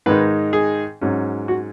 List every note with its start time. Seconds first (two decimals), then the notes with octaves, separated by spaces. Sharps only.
0.06 G#2 D#3 G#3 D#4 B4
0.53 G#4
1.01 G#2 F#3 C#4
1.48 F#4